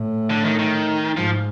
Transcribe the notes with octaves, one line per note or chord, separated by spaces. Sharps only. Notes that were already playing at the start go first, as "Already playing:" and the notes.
Already playing: A2
D3
D#3
D#3
G#2 F3